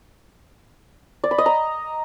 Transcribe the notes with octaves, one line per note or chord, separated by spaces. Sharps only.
D5
B5
D#5
A#5